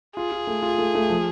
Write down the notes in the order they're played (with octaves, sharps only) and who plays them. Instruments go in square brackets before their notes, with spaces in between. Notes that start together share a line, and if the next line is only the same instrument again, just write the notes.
[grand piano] F4 [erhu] G#4
[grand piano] F4
A3
F4
A3
A3
F3